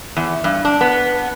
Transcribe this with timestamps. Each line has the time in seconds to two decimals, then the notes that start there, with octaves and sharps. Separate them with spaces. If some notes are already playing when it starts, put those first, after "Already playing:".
0.16 E2
0.44 G2
0.65 D4
0.81 B3